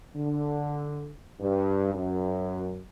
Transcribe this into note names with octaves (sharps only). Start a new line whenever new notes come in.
D3
G2
F#2